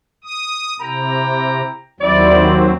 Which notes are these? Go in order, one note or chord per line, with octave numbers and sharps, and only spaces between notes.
D#6
C3 E4 G5 A#5
D#2 F#3 G3 C4 E4 D5